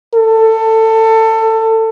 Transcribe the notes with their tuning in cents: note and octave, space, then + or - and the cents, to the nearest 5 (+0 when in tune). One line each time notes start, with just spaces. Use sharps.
A4 +20